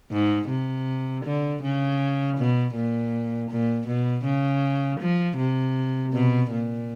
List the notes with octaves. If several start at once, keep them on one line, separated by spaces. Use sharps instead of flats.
G#2
C3
D3
C#3
B2
A#2
A#2
B2
C#3
F3
C3
B2
A#2